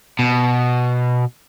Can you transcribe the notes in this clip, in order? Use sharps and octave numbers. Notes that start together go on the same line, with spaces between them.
B2